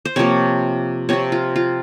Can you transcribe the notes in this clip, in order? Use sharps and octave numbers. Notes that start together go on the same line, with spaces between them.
C5
C3 F3 A#3 C#5
C3 F3 C4 C#5
F4
F4